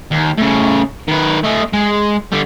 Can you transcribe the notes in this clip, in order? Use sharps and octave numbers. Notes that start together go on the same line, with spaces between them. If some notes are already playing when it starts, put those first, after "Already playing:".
D#2
A2 C#3
D#3 B4
A3 D#5
G#3
D3 G3